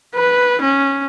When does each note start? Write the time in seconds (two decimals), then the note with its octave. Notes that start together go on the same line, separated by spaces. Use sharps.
0.15 B4
0.62 C#4